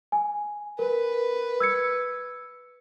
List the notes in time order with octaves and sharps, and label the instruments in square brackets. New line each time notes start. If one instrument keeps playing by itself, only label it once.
[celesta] G#5
[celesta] A#4 [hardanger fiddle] B4
[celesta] E6 G#6 C#7